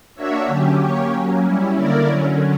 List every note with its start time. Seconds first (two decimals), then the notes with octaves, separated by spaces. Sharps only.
0.15 A#3 D4 F#4 C#5 E5
0.47 D3 F#3 C#4 G4
0.79 A#3 C#4 G4 C#5
1.11 F#3 A#3 C#4
1.43 G3 C#4 E4
1.75 D3 A#3 E4 A#4 D5
2.07 D3 F#3 C#4